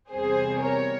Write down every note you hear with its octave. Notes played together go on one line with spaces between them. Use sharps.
E2 C3 G3 C4 G#4 C5
A#4 C#5